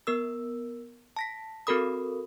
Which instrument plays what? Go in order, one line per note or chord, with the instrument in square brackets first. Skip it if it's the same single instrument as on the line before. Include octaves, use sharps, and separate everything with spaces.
[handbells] B3 A#4 E6
A5 A#6 B6
C4 F#4 A4 A#4 B5 D#6